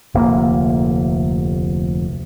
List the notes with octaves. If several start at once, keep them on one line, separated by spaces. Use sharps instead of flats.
F1 D2 A#3